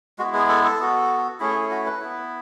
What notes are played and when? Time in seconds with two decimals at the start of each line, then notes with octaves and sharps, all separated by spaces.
0.19 G#3 B3 E4 F#4
0.34 G#4
0.49 A4
0.64 A4
0.80 B3 F#4
1.40 A3 C#4 E4 G#4
1.55 G#4
1.71 F#4
1.86 B4
2.01 B3 E4